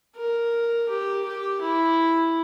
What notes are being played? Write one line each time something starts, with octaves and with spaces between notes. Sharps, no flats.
A#4
G4
G4
E4